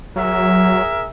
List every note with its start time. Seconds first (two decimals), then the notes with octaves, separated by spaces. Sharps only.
0.16 F#3 G#4 A#4 E5